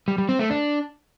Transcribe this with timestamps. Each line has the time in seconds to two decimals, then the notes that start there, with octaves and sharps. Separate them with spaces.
0.08 G3
0.18 G3
0.29 C4
0.39 A3
0.50 D4